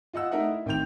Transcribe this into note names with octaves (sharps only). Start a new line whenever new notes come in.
F4 D#5 F#5 E6
A3 D#4 A#4 D#5 E5 F#5
E4
A1 D#3 C4 G5 G6 F7